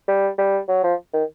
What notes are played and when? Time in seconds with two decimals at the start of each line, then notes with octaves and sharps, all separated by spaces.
0.08 G3
0.38 G3
0.68 F#3
0.84 F3
1.13 D#3